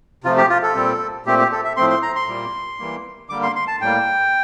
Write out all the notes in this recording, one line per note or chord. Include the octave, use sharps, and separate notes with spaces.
C3 F3 A3 F4
G4
F4
A4
A#2 G3 C4
A#2 A3 C4 G4
G4
A4
E5
A2 F3 A3 C4 C6
C6
A#5
C6
A#2 G3 A#3
E3 G3 A#3
D3 G3 A#3 D6
C6
C6
A5
A2 G3 A#3 G5